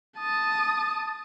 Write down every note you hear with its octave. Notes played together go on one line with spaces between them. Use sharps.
A5 D#6